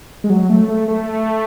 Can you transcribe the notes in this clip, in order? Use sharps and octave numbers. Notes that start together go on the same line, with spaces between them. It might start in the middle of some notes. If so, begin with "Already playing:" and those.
G#3
F#3
A3
A3
A3